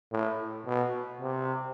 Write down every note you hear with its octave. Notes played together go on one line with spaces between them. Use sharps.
A2
B2
C3